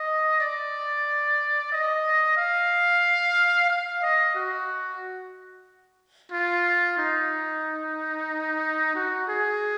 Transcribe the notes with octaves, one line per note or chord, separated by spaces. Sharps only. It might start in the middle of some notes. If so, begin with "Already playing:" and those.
Already playing: D#5
D5
D#5
F5
F5
D#5
F#4
F4
D#4
F#4
G#4